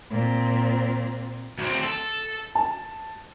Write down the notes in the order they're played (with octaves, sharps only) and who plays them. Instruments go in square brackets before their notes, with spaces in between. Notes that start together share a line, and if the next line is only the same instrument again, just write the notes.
[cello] A#2 C4
[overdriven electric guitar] D2 C4
A4
[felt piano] A5